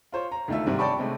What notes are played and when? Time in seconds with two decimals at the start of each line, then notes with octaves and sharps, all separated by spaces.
0.12 F4 C5 C#5
0.32 A#5
0.48 D2 D#3 A3 F4 E5
0.66 G#2 C3 D#3 G3 D4
0.79 C#5 D5 G5 A5 B5 C#6
0.98 C3 G#3 A3